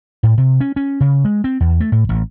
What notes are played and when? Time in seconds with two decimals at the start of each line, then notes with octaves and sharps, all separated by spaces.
0.23 A2
0.38 C3
0.60 C#4
0.76 C#4
1.00 C#3
1.25 G#3
1.44 C4
1.60 E2
1.80 A3
1.92 A2
2.09 A1